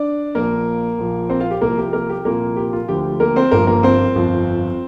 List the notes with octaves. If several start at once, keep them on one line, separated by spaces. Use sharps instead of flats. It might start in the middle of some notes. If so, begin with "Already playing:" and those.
Already playing: D4 D5
A#1 A#2 F3 A#3 A#4
A#1 A#2 F3
C4 C5
F4 F5
G4
C2 C3 F3 A#3 A#4
G4
A#3 A#4
G4
C2 A#2 F3 A#3 A#4
G4
F4
D2 D3 F3 G4
A#3 A#4
C4 C5
G1 G2 F3 A#3 A#4
A#3 A#4
C4 C5
G1 F2 F3